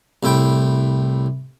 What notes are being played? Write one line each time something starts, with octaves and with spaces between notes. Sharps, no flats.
C2 A2 E4 G5